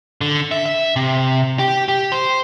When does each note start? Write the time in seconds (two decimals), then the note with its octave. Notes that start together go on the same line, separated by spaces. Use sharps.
0.21 D3
0.52 E5
0.66 E5
0.96 C3
1.59 G4
1.88 G4
2.12 C5